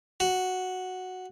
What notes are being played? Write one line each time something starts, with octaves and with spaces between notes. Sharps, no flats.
F#4